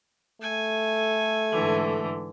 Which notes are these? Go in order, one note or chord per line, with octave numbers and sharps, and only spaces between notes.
A3 A4 G#5
G#2 D3 E3